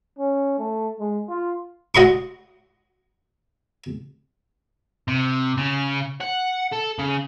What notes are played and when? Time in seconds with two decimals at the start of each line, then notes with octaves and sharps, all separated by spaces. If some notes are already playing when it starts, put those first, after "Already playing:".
0.19 C#4
0.59 A3
1.00 G#3
1.29 F4
1.95 F#4 D#5 C6 C#6
5.08 C3
5.58 C#3
6.21 F#5
6.72 A4
6.99 C#3